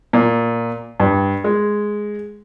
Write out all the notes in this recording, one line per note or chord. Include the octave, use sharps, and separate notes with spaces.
A#2
G2
G#3